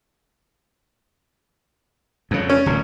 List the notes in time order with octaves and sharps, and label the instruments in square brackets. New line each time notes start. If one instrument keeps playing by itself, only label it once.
[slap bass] F2 C#3
[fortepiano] C#4
[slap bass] D1 A#2